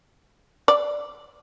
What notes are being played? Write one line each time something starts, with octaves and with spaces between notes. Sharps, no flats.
D5